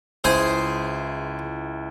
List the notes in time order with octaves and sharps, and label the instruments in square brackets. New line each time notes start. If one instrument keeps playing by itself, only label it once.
[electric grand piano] C#2 E4 [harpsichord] G#4 C5 C6